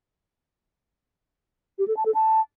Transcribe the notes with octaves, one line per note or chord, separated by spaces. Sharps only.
G4
A4
A5
A4
A5